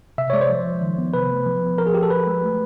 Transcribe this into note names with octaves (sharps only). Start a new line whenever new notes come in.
C3 E5
C#5
G#3 D5
C5
F3
F3
D#3
B3
C3 B4
A3
F3
B3
F3 A#4
G#4
F3 G4
A4
F3 B4
G#3
A3